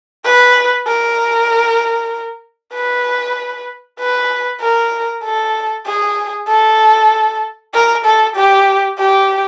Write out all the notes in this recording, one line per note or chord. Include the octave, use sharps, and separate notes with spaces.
B4
A#4
B4
B4
A#4
A4
G#4
A4
A#4
A4
G4
G4